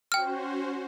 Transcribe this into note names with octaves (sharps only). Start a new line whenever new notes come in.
C#4 F#4 C5 G5 F6